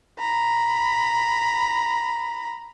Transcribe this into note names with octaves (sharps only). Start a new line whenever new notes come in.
A#5 B5